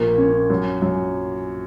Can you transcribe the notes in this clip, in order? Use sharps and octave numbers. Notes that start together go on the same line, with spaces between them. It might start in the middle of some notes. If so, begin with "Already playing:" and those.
Already playing: A#1 A#3
C#4
F#2
F#2